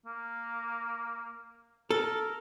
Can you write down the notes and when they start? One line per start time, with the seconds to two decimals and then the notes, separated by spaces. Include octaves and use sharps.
0.06 A#3
1.91 A4 A#4